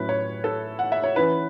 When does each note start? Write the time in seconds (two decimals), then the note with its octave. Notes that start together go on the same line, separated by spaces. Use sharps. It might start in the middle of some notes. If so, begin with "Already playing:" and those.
Already playing: A2 F#3 C#4 E4 B4
0.09 C#5
0.44 A4
0.79 F#5
0.92 E5
1.04 C#5
1.16 E3 C#4 E4 B4